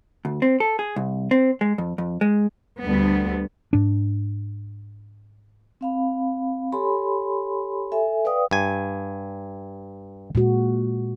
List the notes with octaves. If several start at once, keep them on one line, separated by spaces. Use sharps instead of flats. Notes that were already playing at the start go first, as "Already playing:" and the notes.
D2
C4
A4
G#4
C2
C4
G#3
F2
F2
G#3
D2 G3 B3
G#2 D4
C4 F5 B5
G4 A4 C#5 G#5 B5 C6
A4 E5 G#5
B4 D5 F5 G5 D#6
G2 G#5
A#2 G#3 F#4